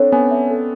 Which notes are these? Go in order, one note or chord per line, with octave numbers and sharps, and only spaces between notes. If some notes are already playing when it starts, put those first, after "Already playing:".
Already playing: C4 D4 A4 C#5
B3 C#4 G#5
E5
A4